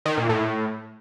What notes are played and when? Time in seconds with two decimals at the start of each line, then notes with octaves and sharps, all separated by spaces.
0.06 D#3
0.17 A#2
0.29 A2